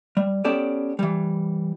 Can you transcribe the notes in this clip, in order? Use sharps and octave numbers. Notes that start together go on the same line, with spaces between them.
G3
B3 C#4 G4 A4 D5
E3 G3